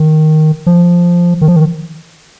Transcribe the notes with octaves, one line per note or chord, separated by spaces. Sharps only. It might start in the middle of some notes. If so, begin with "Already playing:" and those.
Already playing: D#3
F3
D#3
F3
D#3